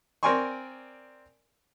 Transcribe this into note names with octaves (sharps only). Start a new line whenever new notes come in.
C4 A#4 D5 G#5 C6 C#6